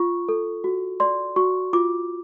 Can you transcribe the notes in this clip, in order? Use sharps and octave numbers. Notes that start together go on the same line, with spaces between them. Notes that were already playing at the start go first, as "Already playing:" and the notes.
Already playing: F4 C#6
A4
F#4
D5 C6
F#4 C#6
F4 D6